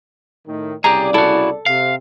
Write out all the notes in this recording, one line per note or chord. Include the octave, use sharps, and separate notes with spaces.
A2 D#3
C2 C#3 G4 G#4 D5 A#5
E4 F#4 A4
C3 F5